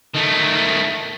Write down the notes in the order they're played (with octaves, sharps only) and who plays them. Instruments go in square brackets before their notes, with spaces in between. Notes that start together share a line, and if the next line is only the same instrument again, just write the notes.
[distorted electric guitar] D#3 A3